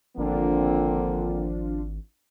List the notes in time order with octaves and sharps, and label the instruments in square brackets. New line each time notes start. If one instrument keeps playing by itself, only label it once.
[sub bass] G#1 [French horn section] D3 A#3 C4 [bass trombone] F3 [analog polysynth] D4 F4